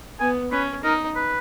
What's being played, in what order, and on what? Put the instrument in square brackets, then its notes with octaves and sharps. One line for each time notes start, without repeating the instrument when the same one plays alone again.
[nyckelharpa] B3 [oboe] G#5
[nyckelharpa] C#4 [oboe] B4
[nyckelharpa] D#4 [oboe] A#4
[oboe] B4